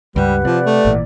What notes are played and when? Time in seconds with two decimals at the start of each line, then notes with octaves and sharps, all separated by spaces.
0.16 C#2 G2 G3 G4 B4 F#5
0.45 C3 F3 D5
0.66 A3
0.85 G#1 A#2 E3